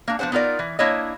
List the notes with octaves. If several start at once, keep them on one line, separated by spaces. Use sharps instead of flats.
A#3 D4
F3 B3 D4 C5 F#5
B3 D#4 F4 A#4 D5
E3
A#3 D4 E4 C#5 D#5